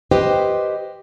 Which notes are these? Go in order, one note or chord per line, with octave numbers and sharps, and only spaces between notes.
G4 B4 C5 D#5 G5